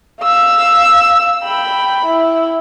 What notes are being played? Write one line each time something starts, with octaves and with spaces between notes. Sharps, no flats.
F5 E6
G5 B5
E4